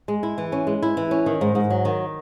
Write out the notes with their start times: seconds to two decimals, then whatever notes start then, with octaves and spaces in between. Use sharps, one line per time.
0.08 G#3
0.23 E4
0.38 E3
0.52 C#4
0.67 G#3
0.82 E4
0.97 E3
1.11 C#4
1.26 D#3
1.41 G#2
1.55 G#2
1.70 F#3
1.85 D#3